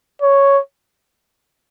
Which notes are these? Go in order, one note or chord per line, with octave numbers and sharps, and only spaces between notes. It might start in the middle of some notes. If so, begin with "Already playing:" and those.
C#5